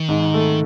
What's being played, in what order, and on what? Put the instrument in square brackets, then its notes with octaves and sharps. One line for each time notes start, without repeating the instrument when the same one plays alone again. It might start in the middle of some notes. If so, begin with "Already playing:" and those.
Already playing: [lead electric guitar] D#3
[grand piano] G#2
A3